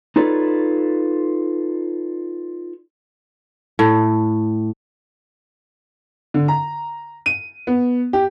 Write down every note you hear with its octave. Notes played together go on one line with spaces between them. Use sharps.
D#4 F4 A4 B4 C#5 D5
A2
D3
A#5
D#7
B3
G4